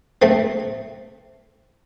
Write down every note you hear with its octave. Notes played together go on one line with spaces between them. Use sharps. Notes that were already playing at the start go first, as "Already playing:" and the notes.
A3 C4